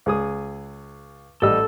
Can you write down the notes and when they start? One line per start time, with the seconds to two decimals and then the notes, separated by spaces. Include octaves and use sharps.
0.06 C#2 G#4 D#6
1.42 A1 G3 A4 D#5 E6